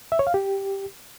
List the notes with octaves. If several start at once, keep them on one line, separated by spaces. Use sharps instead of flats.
E5
C#5
F5
G4